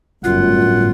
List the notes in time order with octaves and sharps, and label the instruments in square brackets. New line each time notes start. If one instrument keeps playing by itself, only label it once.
[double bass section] G1 A2 [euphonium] F#2 [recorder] F4 [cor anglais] F#5